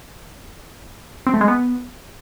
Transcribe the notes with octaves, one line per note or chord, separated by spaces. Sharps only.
C4
A3
G#3
B3